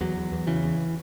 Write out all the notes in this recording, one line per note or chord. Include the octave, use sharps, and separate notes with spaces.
E2 F#3
E2
E2
C#3 E3
E2